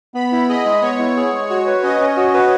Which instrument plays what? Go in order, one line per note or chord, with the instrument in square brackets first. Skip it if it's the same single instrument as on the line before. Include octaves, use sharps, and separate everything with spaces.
[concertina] B3 [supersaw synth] B5
[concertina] E4
[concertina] G#4 [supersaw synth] D#5
[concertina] G#3
[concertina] B3 [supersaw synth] C#5
[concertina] E4
G#4
G#3
[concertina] F#4 [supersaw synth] C#5
[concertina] B4
[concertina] C#4 [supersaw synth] D#5
[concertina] C#4
F#4
B4